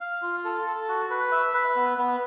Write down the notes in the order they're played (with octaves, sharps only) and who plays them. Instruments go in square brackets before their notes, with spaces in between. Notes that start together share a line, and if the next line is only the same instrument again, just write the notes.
[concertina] F5
F4
A4
A4
F#4
B4
E5
B4
B3
B3